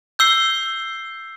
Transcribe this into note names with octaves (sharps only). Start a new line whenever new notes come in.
E6 G6 C7 G7